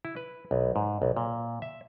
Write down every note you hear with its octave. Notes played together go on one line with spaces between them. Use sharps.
E4
B4
B1
G#2
B1
A#2
E5